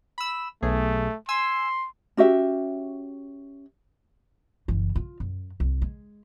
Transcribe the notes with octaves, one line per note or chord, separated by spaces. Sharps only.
B5 E6
B1 A3 G#4
G#5 C6 E6
C#4 F#4 G4 E5
F#1 E3
F4
F#2
C2
G#3